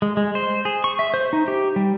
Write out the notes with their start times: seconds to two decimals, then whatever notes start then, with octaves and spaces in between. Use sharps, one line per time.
0.02 G#3
0.17 G#3
0.35 C5
0.65 G#4
0.84 C#6
0.99 E5
1.14 C5
1.33 D#4
1.48 G4
1.76 G3